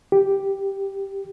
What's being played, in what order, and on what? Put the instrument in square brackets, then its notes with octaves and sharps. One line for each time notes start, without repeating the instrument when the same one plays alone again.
[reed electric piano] G4